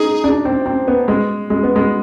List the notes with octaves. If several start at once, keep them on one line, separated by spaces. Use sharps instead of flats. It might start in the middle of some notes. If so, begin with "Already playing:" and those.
Already playing: D#4 G#4
D4
C4
C4
B3
G#3
G#3
B3
G#3